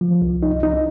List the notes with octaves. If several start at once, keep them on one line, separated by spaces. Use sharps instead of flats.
F3
C2
D#4
D#4